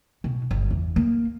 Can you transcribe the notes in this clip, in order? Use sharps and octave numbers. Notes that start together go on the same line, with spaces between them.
B2
G1
E2
A#3